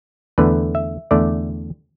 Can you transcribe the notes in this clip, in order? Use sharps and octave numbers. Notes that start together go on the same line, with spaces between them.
E2 D3 A3 B4
E5
E2 D3 A3 D5